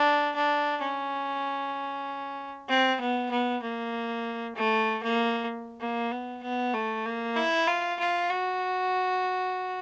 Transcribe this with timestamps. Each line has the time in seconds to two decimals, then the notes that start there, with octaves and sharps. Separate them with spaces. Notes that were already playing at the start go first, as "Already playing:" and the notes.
Already playing: D4
0.35 D4
0.82 C#4
2.68 C4
3.00 B3
3.31 B3
3.62 A#3
4.56 A3
5.03 A#3
5.80 A#3
6.11 B3
6.43 B3
6.74 A3
7.05 A#3
7.36 E4
7.68 F4
7.99 F4
8.30 F#4